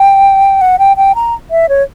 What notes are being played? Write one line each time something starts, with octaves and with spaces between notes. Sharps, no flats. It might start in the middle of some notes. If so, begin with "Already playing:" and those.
Already playing: G5
F#5
G5
G5
A#5
E5
C#5